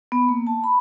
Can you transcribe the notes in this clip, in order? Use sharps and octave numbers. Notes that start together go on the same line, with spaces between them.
B3
A#3
A5
B5